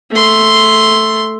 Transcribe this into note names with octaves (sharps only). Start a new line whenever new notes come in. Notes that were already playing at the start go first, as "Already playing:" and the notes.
A3 C6